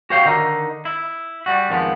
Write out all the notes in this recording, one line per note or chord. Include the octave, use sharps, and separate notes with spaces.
F#4 G4 C5 C#5 F5 G5
D3 D#3 D#4
E4
G3 F#4
F2 D#3 F3 G#3 B3